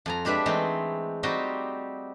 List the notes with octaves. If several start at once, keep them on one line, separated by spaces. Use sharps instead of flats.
F2 G#5 A#5
G#3 D4 G4 B4 E5
E3 G#3 A3 C4 D#4
G3 C4 D#4 F#4 G4 D#5